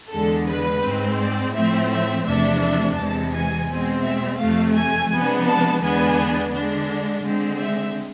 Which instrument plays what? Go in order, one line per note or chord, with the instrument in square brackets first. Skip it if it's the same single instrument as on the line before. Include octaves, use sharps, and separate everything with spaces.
[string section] E2 D3 G#3 A4
B4
G#2 G#3 C4
D5
A2 F3 A3 C4 E5
E5
E2 C3 F3 A3 D4 E5
E5
E2 C3 E3 G#3 A5
G#5
B2 G#3 C4
E5
F2 C3 F3 A3 F5
G#5
C3 F3 G#3 B3 D4
A5
E2 D3 G#3 B3 D4 G#5
D3 G#3 D4
D3 G#3 C4
E5